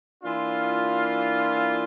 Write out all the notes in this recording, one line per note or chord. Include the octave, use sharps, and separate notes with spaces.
E3 A#3 D4 F4